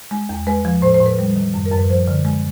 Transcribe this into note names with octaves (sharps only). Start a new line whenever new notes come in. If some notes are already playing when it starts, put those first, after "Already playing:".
G#3
E2
G#3 B4
F3
A2 C5
C5
A2
B4
G3
D#3
F#2
A#4
F#2
B4
F3 C5
D3
G#3